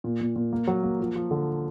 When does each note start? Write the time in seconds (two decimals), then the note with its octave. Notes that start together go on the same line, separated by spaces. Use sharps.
0.04 A#2
0.21 A#2
0.36 A#2
0.53 A#3
0.67 F#3
0.83 A#3
1.00 F3
1.16 F3
1.31 D3